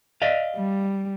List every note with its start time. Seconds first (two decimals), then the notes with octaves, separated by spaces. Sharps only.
0.22 D5 D#5 F5
0.55 G3